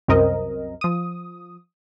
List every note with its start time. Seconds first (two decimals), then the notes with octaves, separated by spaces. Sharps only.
0.08 C2 F#2 C4 A#4 D#5
0.81 F3 D#6